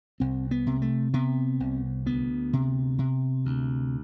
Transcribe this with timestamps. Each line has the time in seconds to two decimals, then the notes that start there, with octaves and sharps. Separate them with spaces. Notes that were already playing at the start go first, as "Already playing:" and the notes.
0.20 C2 C4
0.51 B3
0.66 C3
0.82 A3
1.14 C3 B3
1.60 C2
2.06 D2 B3
2.53 C3
2.99 C3
3.45 D2